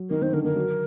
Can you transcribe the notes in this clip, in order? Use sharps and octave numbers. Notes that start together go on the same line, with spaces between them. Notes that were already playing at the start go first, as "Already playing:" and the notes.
Already playing: F#3
D#3 A#4
D#3 C5
D3 A#4
D#3 A#4
F#3